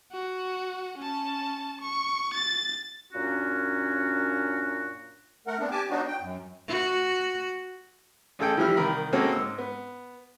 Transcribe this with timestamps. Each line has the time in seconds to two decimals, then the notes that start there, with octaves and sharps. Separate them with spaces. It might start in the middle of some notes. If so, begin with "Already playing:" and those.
0.12 F#4
0.98 C#4 A5
1.81 C#6
2.34 A6
3.13 F#2 A#2 C#4 D4 F#4
5.47 A3 A#4 F#5
5.59 B3 C4 D4
5.71 G4 G#5 A5 D6
5.90 F#3 B3 D4 D#4 F#4
6.07 G5
6.21 F#2
6.69 F#4
8.39 A1 G#4 A4 G5
8.57 E3 F3 G3 E5 F6
8.77 C2 D#3 A#4 B5
9.13 G#3 A#3 C4 C#4 F#4 A4
9.32 G#2 E6
9.58 B3